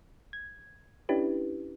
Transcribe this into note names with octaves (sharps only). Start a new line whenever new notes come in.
G#6
C#4 D4 E4 G4 B4